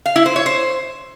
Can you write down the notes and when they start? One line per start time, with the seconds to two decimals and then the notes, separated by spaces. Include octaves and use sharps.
0.06 F5
0.16 E4
0.26 C5
0.36 C#5
0.46 C5